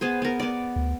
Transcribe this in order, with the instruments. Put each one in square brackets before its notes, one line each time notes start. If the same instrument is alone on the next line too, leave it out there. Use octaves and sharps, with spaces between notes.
[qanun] B3 G#4 C5
B3 A#4
B3 D5
[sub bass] D2